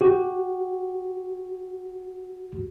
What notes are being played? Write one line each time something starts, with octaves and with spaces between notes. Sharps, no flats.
F#4 G4